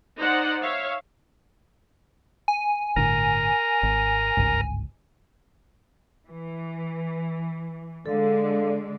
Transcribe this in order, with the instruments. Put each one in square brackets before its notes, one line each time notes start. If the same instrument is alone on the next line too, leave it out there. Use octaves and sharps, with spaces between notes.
[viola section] D#4 C5 D5 F#5
C#5 E5 F5
[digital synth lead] G#5
[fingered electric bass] G1 A2 D3 [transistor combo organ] A#4 A#5
[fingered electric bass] G#1
G1 C#2 G#2
[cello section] E3
[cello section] D3 G#3 D5 [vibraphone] A4 F5